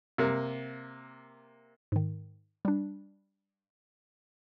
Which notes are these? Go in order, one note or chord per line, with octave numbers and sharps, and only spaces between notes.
C3 A#3
G#2 D#3
G3 D4